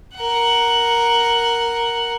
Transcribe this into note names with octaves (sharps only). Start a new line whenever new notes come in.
A#4 F#5